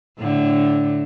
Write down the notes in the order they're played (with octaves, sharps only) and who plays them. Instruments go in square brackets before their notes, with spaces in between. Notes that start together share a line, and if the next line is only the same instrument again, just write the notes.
[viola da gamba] A2 D3